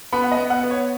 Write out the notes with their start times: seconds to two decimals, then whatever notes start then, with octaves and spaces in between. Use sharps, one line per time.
0.13 B3 B5
0.24 F#5
0.32 D#5
0.37 B3
0.50 F#5
0.63 B3
0.71 C#5